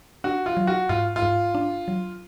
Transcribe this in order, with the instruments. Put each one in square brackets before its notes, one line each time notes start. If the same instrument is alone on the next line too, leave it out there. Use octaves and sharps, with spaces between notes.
[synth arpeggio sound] D4 [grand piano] F#4
[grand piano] F4
[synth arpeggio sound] F#3
[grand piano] F#4
[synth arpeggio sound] G#2 [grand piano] F4
[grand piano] F4
[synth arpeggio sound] G#2
D4
F#3